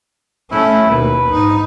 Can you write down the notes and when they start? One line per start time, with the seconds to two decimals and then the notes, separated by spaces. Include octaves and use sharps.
0.52 A3 C#4 E4
0.90 D#2 B2 B4
1.31 G#2 D#4